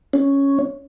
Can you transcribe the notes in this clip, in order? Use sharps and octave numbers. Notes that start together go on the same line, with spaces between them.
C#4